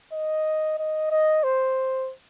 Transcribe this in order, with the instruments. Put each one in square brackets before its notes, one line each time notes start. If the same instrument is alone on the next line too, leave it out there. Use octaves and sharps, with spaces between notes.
[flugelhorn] D#5
D#5
D#5
C5